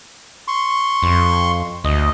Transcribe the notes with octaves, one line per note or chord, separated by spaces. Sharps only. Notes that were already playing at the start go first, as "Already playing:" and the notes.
C6 C#6
F2
D2 D#5